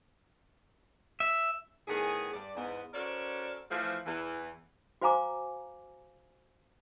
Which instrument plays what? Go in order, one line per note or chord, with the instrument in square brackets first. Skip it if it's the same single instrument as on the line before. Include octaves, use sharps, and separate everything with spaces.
[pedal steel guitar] E5
[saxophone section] A2 D#3 B3 G#4
G2 D5
E2 G#2 B3
C#4 F#4 A4 A#4 C5 D5
E3 F3 A3
E2 E3
[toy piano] F#4 C5 F5 G#5 A#5 D6